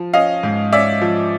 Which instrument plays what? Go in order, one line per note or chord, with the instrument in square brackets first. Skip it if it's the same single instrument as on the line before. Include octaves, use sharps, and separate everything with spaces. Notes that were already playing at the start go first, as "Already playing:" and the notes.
Already playing: [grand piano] F3
C#4 D#5 F5
G#2
C#4 D5 E5
F3